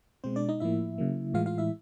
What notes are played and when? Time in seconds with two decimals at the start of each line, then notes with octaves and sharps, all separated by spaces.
0.24 B2 G#3 C4 C5
0.36 D4 D5
0.49 D#4 D#5
0.60 A2 F3 A#3 E4 E5
0.98 C#3 F#3 A#3
1.34 A2 E3 G#3 F4 F5
1.46 F4 F5
1.58 E4 E5